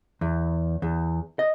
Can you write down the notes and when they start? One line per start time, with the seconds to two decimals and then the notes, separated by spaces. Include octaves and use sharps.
0.21 E2
0.82 E2
1.39 D#5